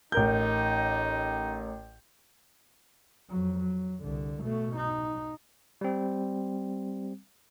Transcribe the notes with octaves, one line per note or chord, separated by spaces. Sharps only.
A1 D#4 A#4 G6
F2 F#3
F#3
C2 D3
B2 A3
D#4
G3 C4